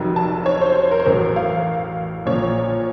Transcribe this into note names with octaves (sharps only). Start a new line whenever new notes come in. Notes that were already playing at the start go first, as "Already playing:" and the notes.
Already playing: F1 F2 D#3 F#3
A5
C#5
C5
C5
A#4
C5
A1 A2 F#3 A#4
F5
A#1 A#2 F3 C#5